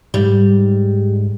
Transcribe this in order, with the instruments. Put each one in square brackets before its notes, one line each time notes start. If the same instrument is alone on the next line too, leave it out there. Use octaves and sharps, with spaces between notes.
[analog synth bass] G#2 [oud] G3